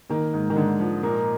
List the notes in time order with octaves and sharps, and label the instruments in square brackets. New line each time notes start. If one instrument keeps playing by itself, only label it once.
[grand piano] D#3 [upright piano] A#3
[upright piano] G#2
[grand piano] D#3
[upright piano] G#2 [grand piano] D3
[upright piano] F3
[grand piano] A#2 [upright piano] A#3